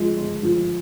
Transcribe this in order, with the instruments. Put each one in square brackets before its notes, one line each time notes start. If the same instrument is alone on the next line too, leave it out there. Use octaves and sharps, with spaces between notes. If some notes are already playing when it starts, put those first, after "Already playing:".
Already playing: [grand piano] F3 G#3
G#3
F3